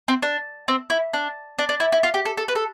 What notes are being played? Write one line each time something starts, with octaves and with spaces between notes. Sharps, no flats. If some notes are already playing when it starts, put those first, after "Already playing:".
C4
D4
C4
E4
D4
D4
D4
E4
E4
F4
G4
A4
A4
B4
A4